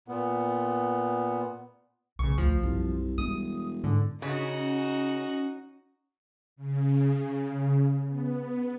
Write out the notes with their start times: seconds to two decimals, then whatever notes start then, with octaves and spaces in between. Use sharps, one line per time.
0.08 A#2 B3
2.19 B1 A2 C#3 C#6
2.38 D2 F3
2.63 C2 F#2
3.18 E1 G3 D#6
3.84 G#2 D3
4.22 C#3 C#4 D#4 F#4
6.56 C#3
8.07 B3